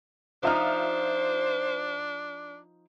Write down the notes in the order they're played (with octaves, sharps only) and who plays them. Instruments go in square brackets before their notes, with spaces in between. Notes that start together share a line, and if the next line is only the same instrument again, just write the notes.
[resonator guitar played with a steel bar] F3 D#4 [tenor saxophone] D4 [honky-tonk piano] F4 E5 F6 [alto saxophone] C5